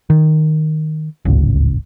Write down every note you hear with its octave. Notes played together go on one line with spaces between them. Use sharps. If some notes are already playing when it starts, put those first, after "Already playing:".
D#3
D1 G#1 C#2